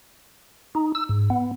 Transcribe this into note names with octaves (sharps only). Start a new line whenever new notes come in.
D#4
E6
G#2
B3